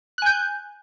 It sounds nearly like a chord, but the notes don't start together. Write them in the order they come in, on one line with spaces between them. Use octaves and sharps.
F#6 G#5 G6